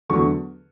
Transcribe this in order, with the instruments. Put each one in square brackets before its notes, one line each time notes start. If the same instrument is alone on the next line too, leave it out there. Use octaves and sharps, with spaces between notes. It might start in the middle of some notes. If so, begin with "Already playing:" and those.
[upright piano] E2 D3 F#3 A3 C#6